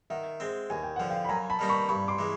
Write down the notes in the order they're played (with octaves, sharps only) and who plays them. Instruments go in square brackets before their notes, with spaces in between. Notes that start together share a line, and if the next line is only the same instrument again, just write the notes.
[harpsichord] D#3 [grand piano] E5 F#5
[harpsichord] G#3 C4
[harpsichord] D#2 [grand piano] G#5
[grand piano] G5
[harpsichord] D3 F3 [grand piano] F#5
[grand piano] F5 G5
B5
[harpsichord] F#2 [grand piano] G#5 A#5
[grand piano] A5 B5
[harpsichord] D#3 G3 A#3 D#4
[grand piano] B5 C#6
[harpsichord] G2 [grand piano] B5 C#6
[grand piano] C6 D6
[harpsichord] E3 G#3